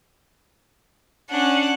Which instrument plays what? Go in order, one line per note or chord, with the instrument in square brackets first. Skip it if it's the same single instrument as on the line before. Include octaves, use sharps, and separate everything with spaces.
[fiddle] C#4 D4 [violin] F#5